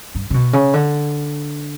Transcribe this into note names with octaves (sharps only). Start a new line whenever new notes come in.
G2
C#3
B2
C#3
D3